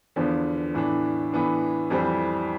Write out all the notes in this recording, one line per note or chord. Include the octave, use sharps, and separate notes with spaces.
E2 D3 F3 B3
A2 E3 B3 D4
A2 E3 B3 D4
F2 E3 G3 C4